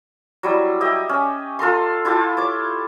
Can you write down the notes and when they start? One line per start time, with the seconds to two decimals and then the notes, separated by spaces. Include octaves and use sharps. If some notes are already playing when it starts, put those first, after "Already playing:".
0.43 F#3 G3 E4
0.81 G4 D#5 E5
1.09 C#4
1.59 F4 A4 A#5 C6
2.05 E4 F4 G4 A5
2.37 C#5 D6